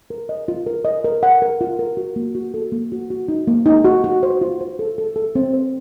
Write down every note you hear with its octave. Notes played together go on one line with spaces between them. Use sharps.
A#4
D#5
F4
A#4
D#5
A#4
F#5
A#4
F4
A#4
F#4
A#3
F#4
A4
A#3
F#4
F#4
D#4
A#3
D#4
F#4
F#4
C5
F4
C5
A4
A4
A4
C4
C5